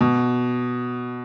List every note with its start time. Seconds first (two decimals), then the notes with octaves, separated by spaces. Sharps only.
0.01 B2